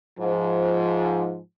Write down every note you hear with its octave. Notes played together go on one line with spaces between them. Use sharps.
G#2 F3